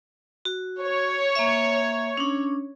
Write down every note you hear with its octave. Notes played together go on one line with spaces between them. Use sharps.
F#4
C#5
A#3 E5
C#4 D4